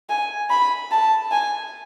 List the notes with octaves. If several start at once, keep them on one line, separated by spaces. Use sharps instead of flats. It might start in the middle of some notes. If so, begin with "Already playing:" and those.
G#5
B5
A5
G#5